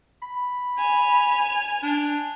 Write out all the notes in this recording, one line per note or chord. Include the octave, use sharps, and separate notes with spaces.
B5
G#5 F7
D4